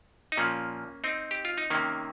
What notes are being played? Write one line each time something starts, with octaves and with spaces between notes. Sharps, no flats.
D#4
A#2 F3 A#3 C#4
C4 D#4
G4
F4
D#4
C3 D#3 A#3 C#4